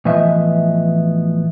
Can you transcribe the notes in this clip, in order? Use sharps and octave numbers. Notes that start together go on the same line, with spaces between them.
A2 E3 F3 B3 D#5 E5